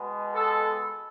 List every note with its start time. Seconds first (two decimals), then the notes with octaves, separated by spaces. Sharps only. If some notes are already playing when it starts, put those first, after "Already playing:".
Already playing: B2 G#3 B3
0.34 A4